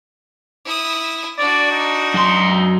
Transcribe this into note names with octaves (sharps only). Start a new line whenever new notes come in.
E4 D#6
D4 F#4 D5
D#4
F#2 C6